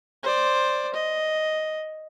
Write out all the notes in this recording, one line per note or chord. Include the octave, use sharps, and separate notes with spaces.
C5 D5
D#5